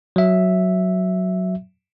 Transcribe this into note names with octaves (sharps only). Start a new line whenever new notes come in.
F#3 E5